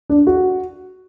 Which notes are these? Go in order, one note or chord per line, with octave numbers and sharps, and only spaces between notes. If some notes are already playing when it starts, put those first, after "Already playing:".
D4
F#4